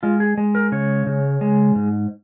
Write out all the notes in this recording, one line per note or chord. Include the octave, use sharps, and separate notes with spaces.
G#3 F4
G#4
G#3
A#4
C#3 C#5
C#3
G#3
G#2